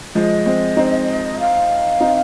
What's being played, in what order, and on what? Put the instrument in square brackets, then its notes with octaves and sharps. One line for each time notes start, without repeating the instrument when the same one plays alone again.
[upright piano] F3 G#3 [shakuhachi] D#5
[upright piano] G#3 C4
C4 D#4
[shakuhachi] F5
[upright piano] C4 D#4